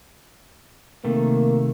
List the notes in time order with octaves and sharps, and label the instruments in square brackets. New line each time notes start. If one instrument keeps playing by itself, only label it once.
[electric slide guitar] C3 D#3 A3 [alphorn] A#3